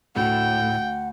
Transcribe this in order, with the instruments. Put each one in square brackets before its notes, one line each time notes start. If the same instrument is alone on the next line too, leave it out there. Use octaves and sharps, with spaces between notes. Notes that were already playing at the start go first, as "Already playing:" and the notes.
[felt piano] D2 [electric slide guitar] A2 A3 [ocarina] F#5 [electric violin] G5